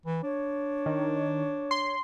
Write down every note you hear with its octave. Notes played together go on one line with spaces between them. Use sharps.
E3
D4 C#5
D#3
C6